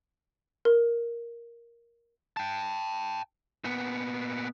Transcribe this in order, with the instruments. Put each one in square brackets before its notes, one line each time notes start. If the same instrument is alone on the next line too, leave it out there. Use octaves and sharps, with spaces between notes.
[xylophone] A#4
[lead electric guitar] G5 A5
A#2 B3